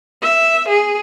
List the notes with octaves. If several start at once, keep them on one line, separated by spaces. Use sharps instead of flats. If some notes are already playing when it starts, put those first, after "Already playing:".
E5
G#4